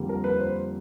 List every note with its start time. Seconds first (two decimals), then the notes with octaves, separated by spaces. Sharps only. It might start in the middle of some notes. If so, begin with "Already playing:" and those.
Already playing: F2 D3 G3 A#3
0.09 A#4
0.24 B4
0.39 C5